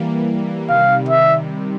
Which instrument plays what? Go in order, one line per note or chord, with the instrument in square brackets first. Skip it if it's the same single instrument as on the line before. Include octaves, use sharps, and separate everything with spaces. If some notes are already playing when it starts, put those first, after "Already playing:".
Already playing: [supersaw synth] E3 G3 A#3
[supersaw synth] C3 D#3 G3 [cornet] F5
[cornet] E5